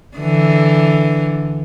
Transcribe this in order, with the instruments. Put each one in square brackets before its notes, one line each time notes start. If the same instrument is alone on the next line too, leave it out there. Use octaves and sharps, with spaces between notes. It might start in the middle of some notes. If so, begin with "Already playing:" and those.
[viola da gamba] D3 E3